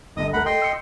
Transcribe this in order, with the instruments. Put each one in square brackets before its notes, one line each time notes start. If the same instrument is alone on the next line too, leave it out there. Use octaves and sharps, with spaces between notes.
[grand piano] G1 D3 A#6 [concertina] D#5 D#6
[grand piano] D2 A3 A#4 [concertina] F#5 B5
[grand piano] A4 [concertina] D#5 G5 C6
[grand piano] E6 C#7